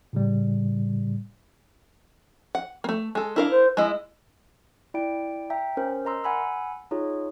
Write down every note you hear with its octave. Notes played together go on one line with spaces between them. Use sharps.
A2 C#3 G3
F#5
A3 A#3
G#3 A4
D4 E4 A#4 F5
C5
G#3 E4 D#5
E4 D5 G5 D7
E5 G5 A#5
C#4 A#4 C5
A#4 D#5 A#5 C6 E6
F#5 G#5 B5 E6
D#4 F4 G#4 C#5